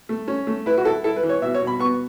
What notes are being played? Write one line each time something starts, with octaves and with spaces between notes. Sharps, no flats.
A3
C#4
A3
E4 B4
F#4
E4 A4
E4 A4
B4
E3
C#5
B2 E5
C#5
B2
B5
B3 C#6